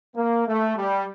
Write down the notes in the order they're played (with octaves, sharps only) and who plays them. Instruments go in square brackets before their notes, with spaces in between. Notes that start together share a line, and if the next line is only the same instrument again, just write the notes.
[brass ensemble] A#3
A3
G3